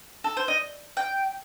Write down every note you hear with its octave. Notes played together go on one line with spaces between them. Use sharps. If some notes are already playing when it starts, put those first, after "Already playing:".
A4
C5
D#5
G5